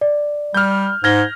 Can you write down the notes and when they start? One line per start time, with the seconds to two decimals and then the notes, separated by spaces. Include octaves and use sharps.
0.01 D5
0.54 G3 F6 G6
1.04 G#2 F6 G#6 A#6 G7